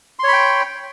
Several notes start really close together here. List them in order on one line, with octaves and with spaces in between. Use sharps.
C6 C#5 B5 G5